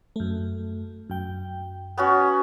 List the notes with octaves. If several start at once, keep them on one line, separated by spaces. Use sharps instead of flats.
F#2 A3
F#2 G5
B3 C#4 F#4